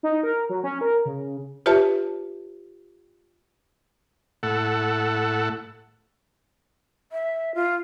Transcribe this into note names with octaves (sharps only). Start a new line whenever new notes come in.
D#4
A#4
F#3
C#4
A#4
C#3
F4 G4 B4 C#5 E5 A5
A2 A4 F#5
E5
F4